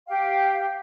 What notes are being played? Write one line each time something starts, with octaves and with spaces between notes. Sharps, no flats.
G4 F5 G5